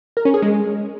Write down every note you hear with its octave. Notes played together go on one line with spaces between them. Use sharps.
A#4
C#4
G#4
G#3